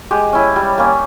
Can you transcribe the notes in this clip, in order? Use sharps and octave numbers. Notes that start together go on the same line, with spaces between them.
G#3 G4
C#4 E4
G3
A#3 C#4